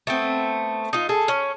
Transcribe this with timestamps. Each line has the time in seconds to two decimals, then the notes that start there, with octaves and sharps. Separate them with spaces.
0.07 A3 B3 C4
0.93 D#4 F4
1.09 G#4 A4
1.28 C#4